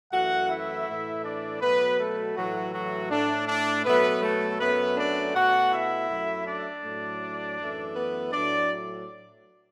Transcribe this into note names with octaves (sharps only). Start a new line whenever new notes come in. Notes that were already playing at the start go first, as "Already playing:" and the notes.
F#2 E3 A3 F#4 F#5
E4 E5
A2 E3 A3
D4 D5
B2 F#3 A3 B3 B4
A3 A4
A2 E3 F#3 A3 F#4
F#3 F#4
A2 A3 D4
D4
B2 F#3 A3 B3 B4
A3 A4
F#2 F#3 A3 B3 B4
D4 D5
B2 A3 F#4 F#5
E4 E5
F#2 F#3 A3
D4 D5
A2 F#3 A3
F#2 E3 A3
B3 B4
A2 F#3 A3 D4 D5